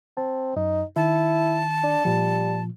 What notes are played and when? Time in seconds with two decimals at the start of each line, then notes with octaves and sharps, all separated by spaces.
0.17 C4 A5
0.56 F#2 D#4
0.96 D#3 E4 A5
1.83 D4
2.05 A#2 F3 G3